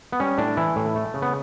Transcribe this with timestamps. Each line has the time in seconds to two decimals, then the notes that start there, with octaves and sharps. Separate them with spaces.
0.12 B3
0.20 G3 C#4
0.38 A2 D4
0.57 E3 E4
0.76 A2
0.96 A3
1.14 C#3
1.22 B3